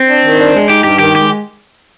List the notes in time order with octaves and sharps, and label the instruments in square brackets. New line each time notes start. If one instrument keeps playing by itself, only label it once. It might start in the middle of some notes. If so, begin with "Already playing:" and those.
Already playing: [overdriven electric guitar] C4
[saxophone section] D4
D#3
D4
G#3
[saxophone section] D#4 [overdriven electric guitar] G4
[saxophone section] G2 [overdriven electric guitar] G4
[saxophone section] D#3 [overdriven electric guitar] G4
[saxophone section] G#3 [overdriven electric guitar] G4